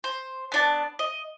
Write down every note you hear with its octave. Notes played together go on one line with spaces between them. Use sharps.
C5
B3 D4 A5
D#5